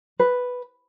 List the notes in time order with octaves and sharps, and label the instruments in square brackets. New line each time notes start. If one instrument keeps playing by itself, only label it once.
[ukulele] B4